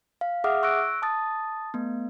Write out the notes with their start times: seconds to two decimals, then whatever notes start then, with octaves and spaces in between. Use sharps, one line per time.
0.21 F5
0.44 G#4 E5 F#5 D6 D#6 F6
0.63 C#6 E6 F#6 A#6 D7
1.02 A5 D#6 A6
1.74 A3 B3